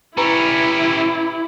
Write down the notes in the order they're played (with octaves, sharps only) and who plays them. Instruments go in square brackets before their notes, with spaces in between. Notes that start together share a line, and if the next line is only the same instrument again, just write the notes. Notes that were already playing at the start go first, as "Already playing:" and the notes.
[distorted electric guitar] G3 C#4 [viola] E4 [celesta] B4 A#5 B5